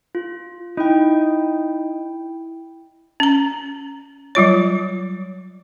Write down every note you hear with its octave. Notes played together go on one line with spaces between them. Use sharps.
F4
D#4 E4 G5
C#4 A#5
F#3 G3 F4 C#5